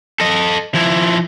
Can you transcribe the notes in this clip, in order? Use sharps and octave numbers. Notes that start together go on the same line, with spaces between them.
A4 D#5
F3 E4